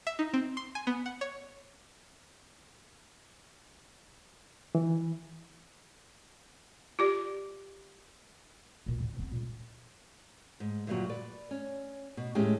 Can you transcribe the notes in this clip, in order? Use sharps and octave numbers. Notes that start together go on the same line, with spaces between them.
E5
D#4
C4
C6
G#5
B3
F#5
C#5
E3
F4 G4 D5
B1 A#2
A2 D3
B3 C4
C#2 A#2
G#2
D2 G2 A#2 F3 F#3 F#4
B4 D5
C#4
B2
E2 A2 G#3 C#4 G4